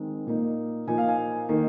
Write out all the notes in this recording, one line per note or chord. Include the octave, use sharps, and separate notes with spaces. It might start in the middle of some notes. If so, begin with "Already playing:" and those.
Already playing: D#3 G#3 C4 D#4
A#2 A#3 D#4
A#2 F3 A#3 D#4 G#5
F5
G#5
D#3 A#3 D#4